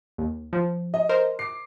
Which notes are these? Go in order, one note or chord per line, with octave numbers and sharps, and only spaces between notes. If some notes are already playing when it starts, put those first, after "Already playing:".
D#2
F3
D#5
A#4 C5
D6 C7